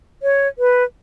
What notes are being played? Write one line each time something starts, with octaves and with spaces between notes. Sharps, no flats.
C#5
B4